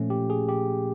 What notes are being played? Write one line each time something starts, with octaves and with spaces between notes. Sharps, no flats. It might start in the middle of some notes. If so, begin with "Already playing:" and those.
Already playing: A#2 F3 A3 C#4
G4
G#4
G4